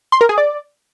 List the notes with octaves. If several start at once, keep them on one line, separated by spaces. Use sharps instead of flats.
C6
A#4
G#4
D5